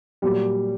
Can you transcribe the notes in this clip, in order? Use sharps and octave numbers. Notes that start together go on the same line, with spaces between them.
A#2 F#3 G3